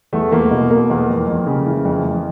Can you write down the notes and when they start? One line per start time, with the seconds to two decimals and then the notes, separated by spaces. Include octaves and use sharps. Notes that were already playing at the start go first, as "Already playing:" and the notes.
0.13 E2 A3
0.32 E2 A#3
0.51 B2
0.71 B2 A#3
0.90 E2
1.09 F2
1.27 F2
1.47 C#3
1.66 E3
1.85 F2
2.05 F2